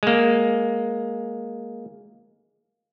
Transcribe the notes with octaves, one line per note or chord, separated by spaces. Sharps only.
G#3 A#3